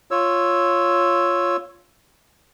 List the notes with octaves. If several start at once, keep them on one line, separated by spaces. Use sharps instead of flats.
F4 C#5 E6